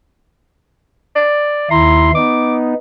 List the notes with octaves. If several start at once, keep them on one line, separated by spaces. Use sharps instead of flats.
D5
D#2 E4 A#5 C6
B3 D#4 D6